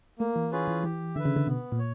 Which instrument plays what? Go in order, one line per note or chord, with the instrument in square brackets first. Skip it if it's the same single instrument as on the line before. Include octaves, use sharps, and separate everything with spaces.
[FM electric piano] A3 [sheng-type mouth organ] A#3
[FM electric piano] E3
[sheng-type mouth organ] C#4 F4 G#4 B4
[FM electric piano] E3
[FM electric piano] E3 [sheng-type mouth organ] G4
[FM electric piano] D3 [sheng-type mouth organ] B4 E5
[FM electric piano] C#3
D3
[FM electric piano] B2 [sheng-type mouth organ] B3
[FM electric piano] A#2
[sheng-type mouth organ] C#5